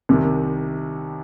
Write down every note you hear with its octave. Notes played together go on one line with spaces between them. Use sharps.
C2 C3 D#3